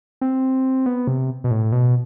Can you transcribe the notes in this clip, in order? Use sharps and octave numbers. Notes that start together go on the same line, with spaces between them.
C4
B3
C3
B2
A2
B2